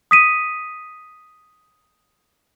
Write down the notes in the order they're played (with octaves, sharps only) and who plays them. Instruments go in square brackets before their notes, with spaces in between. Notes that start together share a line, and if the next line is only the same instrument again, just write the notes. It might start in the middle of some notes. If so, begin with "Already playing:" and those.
[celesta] D#6 B6 D#7